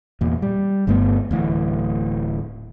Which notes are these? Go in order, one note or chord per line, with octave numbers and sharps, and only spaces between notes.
E2 A#2
G3
G1 G2 A3 B3
D1 A2 E3